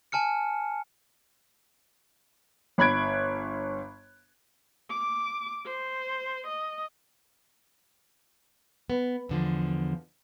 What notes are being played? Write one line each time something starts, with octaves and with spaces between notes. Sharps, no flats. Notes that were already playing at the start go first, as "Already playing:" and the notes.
G#5 A5 F6 C#7
G1 B5 F#6 G#6 D7
D6
C5
D#5
B3
E2 D3 F3